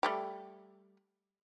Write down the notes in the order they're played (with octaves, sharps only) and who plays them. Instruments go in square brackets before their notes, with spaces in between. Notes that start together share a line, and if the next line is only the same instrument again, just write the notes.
[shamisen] G3 A3 G4